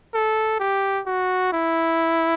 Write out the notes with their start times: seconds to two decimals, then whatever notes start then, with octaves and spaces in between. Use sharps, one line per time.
0.14 A4
0.59 G4
1.06 F#4
1.52 E4